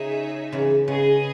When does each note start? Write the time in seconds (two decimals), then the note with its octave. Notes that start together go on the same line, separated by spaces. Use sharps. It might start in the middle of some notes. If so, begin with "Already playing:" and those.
Already playing: C#3 D#4 G#4 C#5 E5
0.52 C#3 E3
0.87 C#3 G#4 B4 D#5 G#5